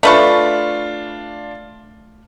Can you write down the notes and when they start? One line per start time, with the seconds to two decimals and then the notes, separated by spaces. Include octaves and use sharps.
0.03 A3 D4 F4 B4 C#6